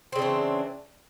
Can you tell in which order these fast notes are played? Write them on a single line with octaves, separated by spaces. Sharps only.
C4 C#3 D4 E3